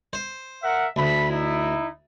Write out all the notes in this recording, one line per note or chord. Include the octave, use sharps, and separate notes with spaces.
C5
A#4 E5 F#5
D2 A4 B5
D#4 E4